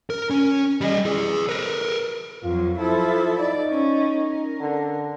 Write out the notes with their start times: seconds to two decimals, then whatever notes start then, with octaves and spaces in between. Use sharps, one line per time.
0.10 A#4
0.30 C#4
0.81 G3 D#5
1.06 G#4 B4
1.49 A#4 B4
2.43 F2 F#3 F4
2.78 F3 E4 A4
3.39 D#4 D5
3.69 C#4
4.14 A#4
4.60 D3